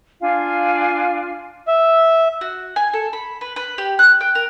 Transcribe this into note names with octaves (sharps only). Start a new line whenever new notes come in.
D4 F4 F5 G#5
E5
F#4
G#5
A4
B5
B4
B4
G4
F#6
G5
A#4